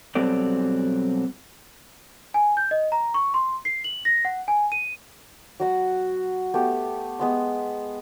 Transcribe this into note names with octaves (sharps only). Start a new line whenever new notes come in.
B2 F#3 G3 C4 A4 D5
G#5
G6
D#5
A#5
C#6
C6
C7
F#7
A#6
F#5
G#5
D#7
F#3 F#4 F#5
A3 B3 G4
G#3 B3 C6